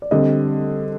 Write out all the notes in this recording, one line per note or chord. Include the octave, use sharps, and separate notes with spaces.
D5
D3 G3 C4 D#5